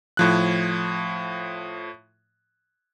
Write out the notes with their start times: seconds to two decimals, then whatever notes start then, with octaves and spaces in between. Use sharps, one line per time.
0.17 A2 F3 F#6